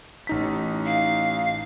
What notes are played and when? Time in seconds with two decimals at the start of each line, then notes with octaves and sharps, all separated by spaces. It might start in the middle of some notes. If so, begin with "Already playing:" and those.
0.27 A1 D#4 B6
0.86 F5